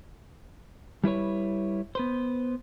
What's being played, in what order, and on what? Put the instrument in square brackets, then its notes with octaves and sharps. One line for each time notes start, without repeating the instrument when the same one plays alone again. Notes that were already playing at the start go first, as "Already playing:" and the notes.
[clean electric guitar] G3 E4 B4 C#5
B3 B4 C5